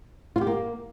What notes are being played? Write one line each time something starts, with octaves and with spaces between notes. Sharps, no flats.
F4
G4
A#3